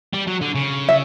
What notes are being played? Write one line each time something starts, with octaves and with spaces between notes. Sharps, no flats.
G3
F#3
D3
C#3
E5